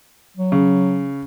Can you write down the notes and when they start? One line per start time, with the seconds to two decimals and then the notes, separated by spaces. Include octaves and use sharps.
0.37 F#3
0.52 C#3